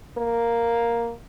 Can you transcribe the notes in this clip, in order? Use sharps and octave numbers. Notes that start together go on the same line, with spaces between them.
A#3